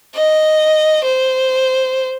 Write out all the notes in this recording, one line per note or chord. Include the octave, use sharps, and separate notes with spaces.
D#5
C5